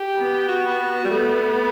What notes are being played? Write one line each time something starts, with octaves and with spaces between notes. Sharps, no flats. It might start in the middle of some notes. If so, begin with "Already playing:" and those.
Already playing: G4
B3
F#4
G3
A3 B3